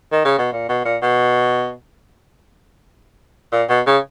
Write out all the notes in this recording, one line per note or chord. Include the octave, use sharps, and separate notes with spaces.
D#3
C#3
B2
A#2
B2
A#2
B2
A#2
B2
C#3